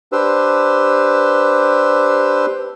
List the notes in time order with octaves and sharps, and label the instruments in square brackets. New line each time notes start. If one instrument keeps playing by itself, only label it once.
[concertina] D4 G4 B4 C5 E6